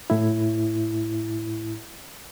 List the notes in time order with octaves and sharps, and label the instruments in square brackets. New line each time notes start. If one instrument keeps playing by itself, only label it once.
[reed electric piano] A2 E4